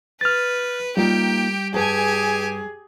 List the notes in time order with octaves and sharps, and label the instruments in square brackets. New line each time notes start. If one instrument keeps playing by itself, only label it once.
[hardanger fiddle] B4 [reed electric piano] F6 A6
[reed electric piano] G3 [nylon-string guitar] A#3 D#4 F4 [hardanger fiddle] G4 G5
[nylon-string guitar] G2 B4 A5 [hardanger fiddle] G4 G#5 [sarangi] G#4